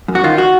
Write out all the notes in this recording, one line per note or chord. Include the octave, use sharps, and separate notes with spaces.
F#2
F#4
D#3 F4
F#4